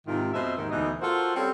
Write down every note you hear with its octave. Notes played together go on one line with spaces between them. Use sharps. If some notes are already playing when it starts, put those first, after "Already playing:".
G#2 C3 D#3 E4 F4
F2 B2 C5 D#5 E5
D#2 G#2 D#3
D2 B2 E3 D#4 D#5
F4 F#4 A4 A#4 C5
G3 C4 C#4 G#4 A4